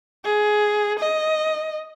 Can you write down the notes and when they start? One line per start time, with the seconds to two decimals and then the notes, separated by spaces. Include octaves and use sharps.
0.25 G#4
0.99 D#5